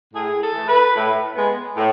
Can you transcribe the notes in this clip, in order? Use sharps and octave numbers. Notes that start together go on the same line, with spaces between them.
A2 G#4
A4
E3 A3
B4
A2
G#3 B3
A2